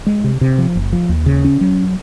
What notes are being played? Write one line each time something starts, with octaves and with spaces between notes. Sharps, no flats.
G#3
C3
C3
F3
F#1
F3
D#2
C#3
C#4
F#3